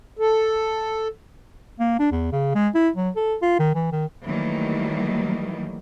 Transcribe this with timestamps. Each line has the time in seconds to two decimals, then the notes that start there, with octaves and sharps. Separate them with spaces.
0.19 A4
1.79 A#3
1.99 D4
2.11 E2
2.32 C#3
2.55 G#3
2.75 E4
2.96 F#3
3.16 A4
3.42 F4
3.59 D#3
3.75 E3
3.92 D#3
4.26 D#3 E3 F#3 G3 A3 A#3